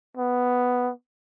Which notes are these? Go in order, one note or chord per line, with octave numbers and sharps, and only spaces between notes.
B3